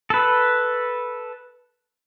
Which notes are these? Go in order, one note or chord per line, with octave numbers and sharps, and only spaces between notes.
A4 B4